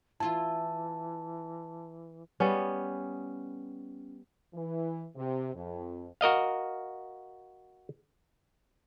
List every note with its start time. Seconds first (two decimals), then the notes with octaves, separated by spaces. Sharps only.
0.20 E3 E4 F4 A5
2.40 G3 B3 C#4
4.55 E3
5.16 C3
5.54 F2
6.21 F#4 A#4 D#5 F5